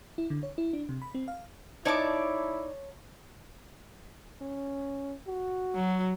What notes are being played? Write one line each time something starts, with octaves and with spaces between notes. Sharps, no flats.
E4
D3
C#5
E4
D4
C3
B5
C4
F5
D#4 E4 C#5 D5 A5 D6
C#4
F#4
F#3